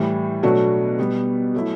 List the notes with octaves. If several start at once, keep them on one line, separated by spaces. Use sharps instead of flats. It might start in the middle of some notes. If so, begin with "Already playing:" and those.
Already playing: A2 E3 G3
B2 F#3 A3 D4 F#4
B2 G3 B3
F#3 A3 E4